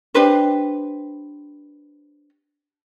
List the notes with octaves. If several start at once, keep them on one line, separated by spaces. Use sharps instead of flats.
D4 G4 B4 C5